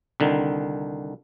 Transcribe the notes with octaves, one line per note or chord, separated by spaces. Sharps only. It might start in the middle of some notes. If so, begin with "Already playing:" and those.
C2 D3 D#3